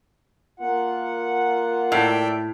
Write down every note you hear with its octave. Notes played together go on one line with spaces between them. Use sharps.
A#3 F4 A#4 F#5
A2 D5 E5 G5